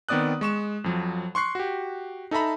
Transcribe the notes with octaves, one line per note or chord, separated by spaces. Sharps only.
D#3 B3 C4 D5 D#6 F#6
G#3 C#6 E7
F2 F3 F#3
C6 C#6 F#6 C7
F#4 G4
D#4 A4 E5 A#5 B5